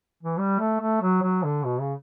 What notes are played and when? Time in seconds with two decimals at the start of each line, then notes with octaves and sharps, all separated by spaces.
0.23 E3
0.38 G3
0.59 A3
0.80 A3
1.01 F#3
1.22 F#3
1.43 D3
1.65 B2
1.80 C#3